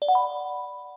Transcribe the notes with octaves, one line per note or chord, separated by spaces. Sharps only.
D5
F#5
B5